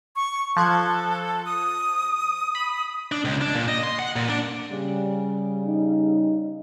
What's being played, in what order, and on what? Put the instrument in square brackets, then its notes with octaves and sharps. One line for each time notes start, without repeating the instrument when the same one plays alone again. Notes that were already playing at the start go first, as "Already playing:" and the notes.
[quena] C#6
[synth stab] F3 F#6 G#6 [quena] A4
[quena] D#6
[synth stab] B5
[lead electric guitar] D4
C#2
D4
A#2
D#5
C6
F#5
A#2
D4
[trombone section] C#3 G3
[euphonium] D#4